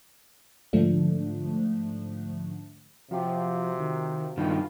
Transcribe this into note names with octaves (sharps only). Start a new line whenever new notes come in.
G#2 D3 F3 A3 D4
C3 F3 F#3 F4 G4
D#3
G2 D#3 F4 B4